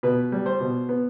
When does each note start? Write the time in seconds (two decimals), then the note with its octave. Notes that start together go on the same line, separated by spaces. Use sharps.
0.03 B2 B4
0.32 G3
0.46 C5
0.60 B2
0.89 B3